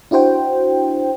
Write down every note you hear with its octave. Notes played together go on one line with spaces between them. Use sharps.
D4 E4 F#4 C5 G5